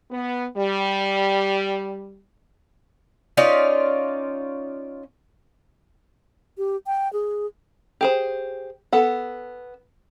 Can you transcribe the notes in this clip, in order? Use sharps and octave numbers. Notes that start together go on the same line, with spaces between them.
B3
G3
C#4 D#4 F4 D5
G4
G5
G#4
G4 G#4 C5
B3 A4 F#5